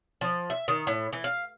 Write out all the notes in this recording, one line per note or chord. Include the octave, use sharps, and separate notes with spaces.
F3
E5
D#3
A2
E3
F5